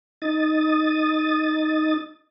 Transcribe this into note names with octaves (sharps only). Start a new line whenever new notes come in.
D#4 D#6 A6